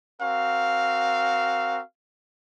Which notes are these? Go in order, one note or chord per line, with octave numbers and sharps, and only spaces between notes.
C4 F#4 A#4 F5